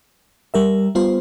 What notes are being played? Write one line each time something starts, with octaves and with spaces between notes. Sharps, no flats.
G3 A#4 E5
G3 B3 F4 C5